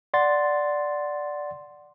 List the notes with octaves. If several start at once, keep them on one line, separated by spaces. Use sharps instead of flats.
D5 F#5 C6 A6